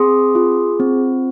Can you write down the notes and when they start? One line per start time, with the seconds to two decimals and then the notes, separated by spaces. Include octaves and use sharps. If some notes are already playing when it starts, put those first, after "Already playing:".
Already playing: C4 G#4 C6 D#6
0.35 F4
0.80 C4